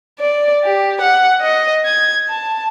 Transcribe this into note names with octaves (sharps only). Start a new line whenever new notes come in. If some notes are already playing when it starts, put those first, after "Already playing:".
D5
G4
F#5
D#5
G#6
A5